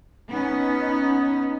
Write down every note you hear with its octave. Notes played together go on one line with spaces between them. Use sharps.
B3 C#4 D#4